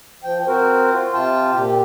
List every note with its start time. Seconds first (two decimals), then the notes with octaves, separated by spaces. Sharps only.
0.24 F3 G5
0.48 C4 F#4 A#4 C5
0.93 F4
1.14 C3 F4 G5 A5
1.55 A#2 G4